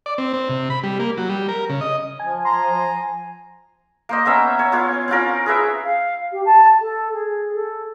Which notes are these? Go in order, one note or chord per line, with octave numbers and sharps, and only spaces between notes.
D5
C4
C4
C3
B5
G3
A#3
F#3
G3
A#4
C#3
D#5
F3 G#5
G#5 A#5 C6
A#3 C5 D#5
B3 C#4 E5 A#5
C#5
B3 F4 C#5
C4 C#4 F4 A#4
G#4 B4 E5
F5
G4
A5
A4
G#4
A4